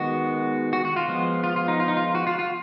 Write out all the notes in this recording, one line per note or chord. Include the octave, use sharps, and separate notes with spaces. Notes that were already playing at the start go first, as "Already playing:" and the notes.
Already playing: D#3 G#3 B3 F#4
F#4
F#4
F4
F3 G#3 B3
F4
F4
D#4
F4
D#4
F4
F#4
F4
F4